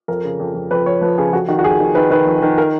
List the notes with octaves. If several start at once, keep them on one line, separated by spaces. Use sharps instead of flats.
F2 A#4
C#3
F2
F2
F2 B4
F2 C#5
F3 B4
C#3 G#4
F2 F#4
D#3 F#4
F#4
F2 G#4
D#3
D#3 B4
D#3 B4
F2
D#3
A#4